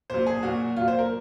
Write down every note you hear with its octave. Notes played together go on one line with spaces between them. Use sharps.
A#2 F#3 C5
G#4
A#2 F#3 F#4
A#2 F#3 F4
C5
A#4